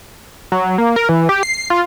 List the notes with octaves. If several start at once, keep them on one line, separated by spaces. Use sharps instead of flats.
F#3
A#3
A#4
E3
G4
C7
F4